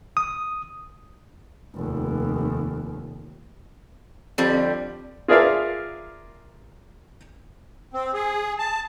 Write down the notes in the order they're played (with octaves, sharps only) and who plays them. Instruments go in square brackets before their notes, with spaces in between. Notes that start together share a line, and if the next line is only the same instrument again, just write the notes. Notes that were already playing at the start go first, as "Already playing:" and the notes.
[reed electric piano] D#6
[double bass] F1 D#2
[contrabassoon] F2 [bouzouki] D3 G3
[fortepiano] F4 G#4 A#4 D5 E5 F5
[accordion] C4
G#4
A5